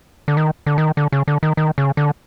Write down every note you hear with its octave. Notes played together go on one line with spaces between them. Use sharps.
D3
D#3
D3
D#3
D3
C#3
D3
D#3
D#3
C#3
D3